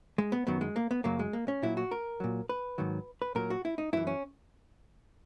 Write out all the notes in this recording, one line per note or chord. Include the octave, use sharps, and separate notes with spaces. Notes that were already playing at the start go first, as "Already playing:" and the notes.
G#3
B3
F#2 D#3 F#3 B3
G#3
A#3
B3
F#2 C#3 F#3 A#3
G#3
A#3
C#4
A#2 F#3 E4
F#4
A#4
A#2 F#3
B4
G#2 D#3 F#3
B4
A#2 F#3 A#4
F#4
E4
D#4
F#2 E3 E4
C#4